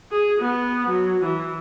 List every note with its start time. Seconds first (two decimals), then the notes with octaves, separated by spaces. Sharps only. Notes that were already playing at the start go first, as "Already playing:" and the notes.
0.11 G#4
0.40 B3
0.88 F#3
1.24 E3